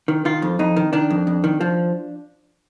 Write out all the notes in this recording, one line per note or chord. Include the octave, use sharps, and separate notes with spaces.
D#3
D#3 F4
F2
F2 D#4
D#3
D#3 D4
F2
F2
D#3
F3